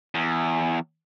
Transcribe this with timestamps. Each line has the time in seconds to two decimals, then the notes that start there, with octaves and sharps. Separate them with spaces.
0.15 E2